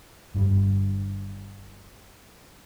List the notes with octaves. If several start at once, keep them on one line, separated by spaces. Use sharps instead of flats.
G1 G2 B2 G3